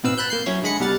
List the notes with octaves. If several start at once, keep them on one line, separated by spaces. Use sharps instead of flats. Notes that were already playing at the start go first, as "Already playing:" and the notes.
G#1 B2 C4 B4 F5 E6
A5 B5 F#6 G6
A#3 G6 C7
F#3 C#4 E4 F#4 C#5
D3 G#3 G#4 B5 A#6 C#7
C2 B2 G3 F#5 F6 A6